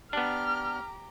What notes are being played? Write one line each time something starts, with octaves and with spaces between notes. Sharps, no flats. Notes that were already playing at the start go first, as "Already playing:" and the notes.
B3 D4 G4 A#5 F6